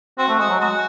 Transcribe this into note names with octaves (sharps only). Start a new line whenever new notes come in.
C4 F#4
A3
G#3 F#4
F#3
G#3 F#4